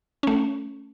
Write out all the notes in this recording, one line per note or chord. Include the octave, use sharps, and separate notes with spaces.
A3 C#4